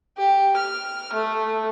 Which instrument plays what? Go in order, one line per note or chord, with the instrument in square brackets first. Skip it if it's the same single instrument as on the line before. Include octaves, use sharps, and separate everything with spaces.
[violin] G4
F6
A3